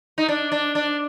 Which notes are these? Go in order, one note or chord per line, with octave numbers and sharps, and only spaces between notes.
D#4
D4
D4
D4